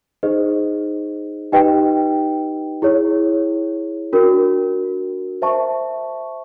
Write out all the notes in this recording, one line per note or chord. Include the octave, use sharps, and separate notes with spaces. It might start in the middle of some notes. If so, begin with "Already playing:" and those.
D#4 G#4 C5 D#5
D#4 G4 B4 D#5 G5
E4 G#4 C#5
D4 F#4 A#4
C5 E5 A5 C#6